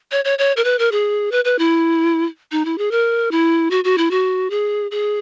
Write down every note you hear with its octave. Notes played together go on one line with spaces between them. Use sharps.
C#5
C#5
C#5
A#4
B4
A#4
G#4
B4
B4
E4
D#4
E4
G#4
A#4
E4
F#4
F#4
E4
F#4
G#4
G#4